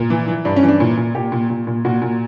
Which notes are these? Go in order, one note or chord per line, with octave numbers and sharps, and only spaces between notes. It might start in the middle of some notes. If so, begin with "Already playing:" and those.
Already playing: A#2
E3
E3
G2 D4
C#4
E3
D4
A#2
A#2
A#2 G4
A#2
A#2
A#2
A#2 F#4
A#2